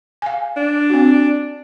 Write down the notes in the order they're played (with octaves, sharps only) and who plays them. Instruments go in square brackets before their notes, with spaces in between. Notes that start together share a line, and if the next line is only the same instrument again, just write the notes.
[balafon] F5 G#5
[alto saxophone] D4
[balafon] C4 F#4